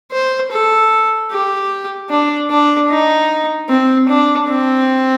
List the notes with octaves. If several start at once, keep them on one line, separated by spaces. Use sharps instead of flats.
C5
A4
G4
D4
D4
D#4
C4
D4
C4